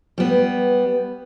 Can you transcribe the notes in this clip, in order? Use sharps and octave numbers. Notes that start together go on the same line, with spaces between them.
G3 B3